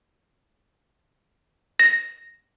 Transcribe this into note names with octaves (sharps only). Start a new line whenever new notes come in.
A#6